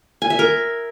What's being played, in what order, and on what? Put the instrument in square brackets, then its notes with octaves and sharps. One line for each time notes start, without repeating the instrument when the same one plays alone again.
[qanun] G#5
E5
A#4